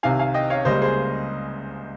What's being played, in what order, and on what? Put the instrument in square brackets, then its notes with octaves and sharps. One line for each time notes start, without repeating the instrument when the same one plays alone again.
[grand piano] C2 C3 D#3 F5 G#5
F5 G#5
D#5 G5
C#5 F5
C#2 C#3 G3 A#3 C5 D#5
G#4 C5